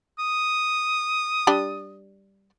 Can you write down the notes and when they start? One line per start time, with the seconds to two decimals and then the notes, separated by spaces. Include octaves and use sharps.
0.19 D#6
1.47 G3 D4 G4